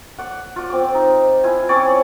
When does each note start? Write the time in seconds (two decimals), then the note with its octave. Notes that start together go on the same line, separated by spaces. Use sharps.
0.18 D5 F#5
0.56 F4 D5
0.70 C4 D6
0.94 D#4
1.44 E4 F4 G#5
1.69 C4 C#4 C#5 D5